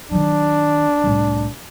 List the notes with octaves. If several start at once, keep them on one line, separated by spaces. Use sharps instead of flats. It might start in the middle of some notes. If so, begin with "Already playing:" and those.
D#3 F#3 D4
C2 A2